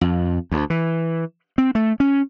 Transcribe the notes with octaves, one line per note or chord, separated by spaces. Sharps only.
F2
D2
E3
C4
A3
C#4